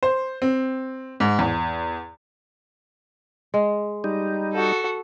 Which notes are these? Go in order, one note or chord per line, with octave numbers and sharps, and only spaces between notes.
C5
C4
G#2
E2
G#3
G3 D#4
F#4 A4